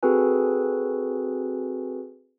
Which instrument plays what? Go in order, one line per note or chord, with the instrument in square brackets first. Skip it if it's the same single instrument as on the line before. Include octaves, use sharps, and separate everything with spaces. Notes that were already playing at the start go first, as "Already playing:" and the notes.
[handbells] C4 F#4 G#4 A4 B4 G#5